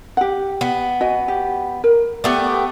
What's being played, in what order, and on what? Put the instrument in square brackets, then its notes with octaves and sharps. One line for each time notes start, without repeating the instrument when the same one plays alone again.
[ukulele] G4 F#5
[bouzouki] B3
[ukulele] F#4 D#5 G#5
G4
A#4
[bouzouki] A3 B3 G4